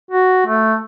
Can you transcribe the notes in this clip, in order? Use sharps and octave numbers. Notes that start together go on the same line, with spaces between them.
F#4
A3